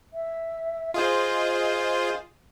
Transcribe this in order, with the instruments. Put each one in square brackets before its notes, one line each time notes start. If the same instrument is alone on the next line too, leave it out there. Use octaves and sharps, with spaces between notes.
[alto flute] E5
[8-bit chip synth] F4 G#4 C5 [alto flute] D#5